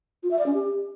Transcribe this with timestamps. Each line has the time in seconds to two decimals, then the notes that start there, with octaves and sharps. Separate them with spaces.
0.23 F4
0.31 E5
0.39 D5
0.46 C#4
0.54 G4